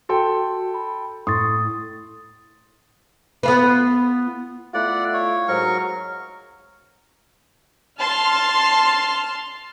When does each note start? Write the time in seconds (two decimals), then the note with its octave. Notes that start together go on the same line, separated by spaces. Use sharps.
0.09 F#4 A4 G5 C6
0.74 B5
1.27 A2 C6 C#6 D#6 A6
3.43 B3 F4 B4
4.74 A3 E4 F4 D5 F#5
5.14 C#5
5.48 G#2 F#3 A#4 C#6
7.99 A5 C6 F6